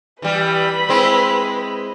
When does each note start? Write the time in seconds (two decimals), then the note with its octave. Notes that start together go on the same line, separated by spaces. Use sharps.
0.22 E3 G3 B4 B5
0.89 G#3 C4 E4